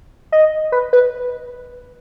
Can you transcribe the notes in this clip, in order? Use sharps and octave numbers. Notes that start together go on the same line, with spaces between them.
D#5
B4
B4